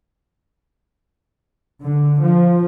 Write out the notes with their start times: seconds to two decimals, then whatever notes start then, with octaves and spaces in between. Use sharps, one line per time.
1.82 D3
2.22 F3